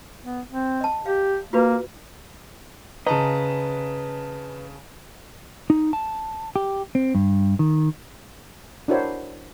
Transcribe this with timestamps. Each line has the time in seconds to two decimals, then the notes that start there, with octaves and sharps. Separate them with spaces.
0.24 B3
0.51 C4
0.81 D#5 A5
1.06 G4 F5
1.53 A#3 F4 F#4 B4
3.07 C#3 B4 D#5 A5 A#5
5.70 D#4
5.93 A5
6.56 G4
6.95 C4
7.15 G2
7.59 D#3
8.88 D4 E4 F#4 A#4 C5 C#5